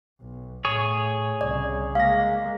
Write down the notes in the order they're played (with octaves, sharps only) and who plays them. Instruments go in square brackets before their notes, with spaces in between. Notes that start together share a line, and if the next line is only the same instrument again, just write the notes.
[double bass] B1
[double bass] A2 [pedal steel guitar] G#4 C#5
[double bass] C2 C#3 [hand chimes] D5
[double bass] G#3 A#3 [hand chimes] F5 A#6